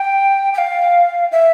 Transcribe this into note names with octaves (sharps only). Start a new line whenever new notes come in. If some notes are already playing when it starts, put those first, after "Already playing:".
Already playing: G5
G5
F5
E5